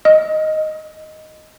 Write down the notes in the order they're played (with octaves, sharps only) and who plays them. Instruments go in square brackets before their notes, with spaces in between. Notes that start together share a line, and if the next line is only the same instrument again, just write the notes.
[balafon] D#5